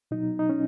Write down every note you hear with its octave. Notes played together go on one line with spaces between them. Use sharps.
B2 F#3 D#4
D#4
C#4